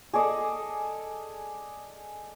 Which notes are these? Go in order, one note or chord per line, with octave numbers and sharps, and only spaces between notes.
G#4 A4 D5 D#5